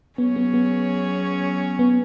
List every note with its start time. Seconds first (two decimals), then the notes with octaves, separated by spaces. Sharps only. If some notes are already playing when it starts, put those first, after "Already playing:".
0.18 F#3 B3 C#4 G#4 C#5
0.36 B3
0.54 B3
1.79 B3